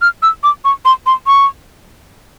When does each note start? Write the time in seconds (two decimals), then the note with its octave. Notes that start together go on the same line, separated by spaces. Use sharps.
0.02 F6
0.23 E6
0.44 D6
0.65 C#6
0.85 C6
1.06 C6
1.27 C#6